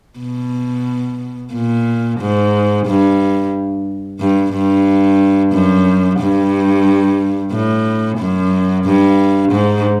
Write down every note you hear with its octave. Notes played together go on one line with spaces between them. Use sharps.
B2
A#2
G#2
G2
G2
G2
F#2
G2
A2
F#2
G2
G#2